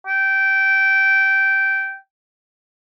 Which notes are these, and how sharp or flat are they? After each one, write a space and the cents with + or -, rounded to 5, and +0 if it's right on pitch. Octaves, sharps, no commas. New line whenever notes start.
G5 -15